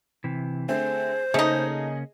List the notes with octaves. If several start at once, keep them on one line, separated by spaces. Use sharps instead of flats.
C3 E3
D3 A3 C4 G#4 C5
C#3 A3 A#3 C#4 D#4 G#4 D#5